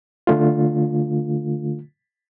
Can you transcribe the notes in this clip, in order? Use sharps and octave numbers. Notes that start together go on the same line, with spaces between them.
D3 A3 F4